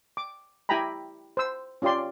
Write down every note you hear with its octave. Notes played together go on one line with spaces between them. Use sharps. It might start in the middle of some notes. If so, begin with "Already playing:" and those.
D6
E4 G4 G5 G#5 A#5 B5
C5 E6
C#4 F4 G4 D5 C6